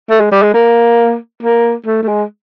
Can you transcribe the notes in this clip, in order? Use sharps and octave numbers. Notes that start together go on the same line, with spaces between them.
A3
G#3
G3
G#3
A#3
A#3
A3
A3
G#3